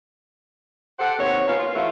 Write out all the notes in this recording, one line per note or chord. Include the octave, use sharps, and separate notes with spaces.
G4 A4 C5 F#5
D#2 C3 B3 C#5
A#3 B3 C#4 F4 F5
F4
E3 A3 A#3 C#4 F4 F#4